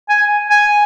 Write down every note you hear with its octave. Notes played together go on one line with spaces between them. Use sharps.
G#5
G#5